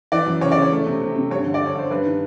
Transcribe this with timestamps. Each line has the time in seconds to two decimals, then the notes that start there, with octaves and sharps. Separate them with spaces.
0.12 E3 D5
0.27 F#2
0.41 C#3 C#5
0.52 D5
0.56 C#3
0.62 C#5
0.72 A3
0.87 C3
1.02 C3
1.16 C3
1.30 G2 C#5
1.46 D3
1.54 D5
1.61 D3 C#5
1.75 G2 C5
1.90 G2 B4
2.06 D#3